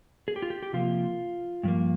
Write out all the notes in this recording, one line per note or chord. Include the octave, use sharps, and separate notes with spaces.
G#4
G4
F4
G4
G4
C3 F3 A#3 F4
G2 F3 A#3